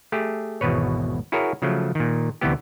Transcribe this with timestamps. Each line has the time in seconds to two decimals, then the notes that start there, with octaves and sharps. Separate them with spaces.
0.12 A3 G4 G#4
0.61 G#1 E2 B2 B4 C#5
1.32 E4 F#4 G#4 A#4 C#5
1.62 C#3 F3 F#3 A3
1.95 A#2 D#3
2.41 D2 C3 E3 B3 G4